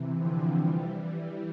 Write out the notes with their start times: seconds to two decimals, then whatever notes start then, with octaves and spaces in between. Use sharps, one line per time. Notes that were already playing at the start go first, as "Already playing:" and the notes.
Already playing: C3 E3
0.17 D3 F3
0.57 E3 G3